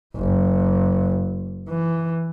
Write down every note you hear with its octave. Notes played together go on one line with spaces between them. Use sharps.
F#1
E3